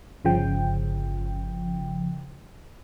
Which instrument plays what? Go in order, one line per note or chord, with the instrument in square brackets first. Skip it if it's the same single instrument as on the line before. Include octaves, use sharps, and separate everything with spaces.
[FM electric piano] G1 C#3 F3 G5